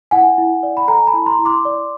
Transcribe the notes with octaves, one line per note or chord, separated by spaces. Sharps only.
E4 F#5 G#5
E4
D5
B5
A4 G#5 A#5
A5 B5
E4
A#5 C6
E4
C6 D6
D5